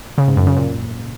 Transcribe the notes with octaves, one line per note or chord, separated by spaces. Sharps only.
C#3
G#2
F#2
C#3
A#2